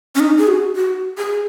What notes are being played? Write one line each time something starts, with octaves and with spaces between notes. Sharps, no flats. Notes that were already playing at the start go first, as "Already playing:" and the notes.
C#4
D#4
G#4
F#4
F#4
G#4